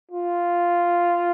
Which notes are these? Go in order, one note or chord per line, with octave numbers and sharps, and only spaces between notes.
F4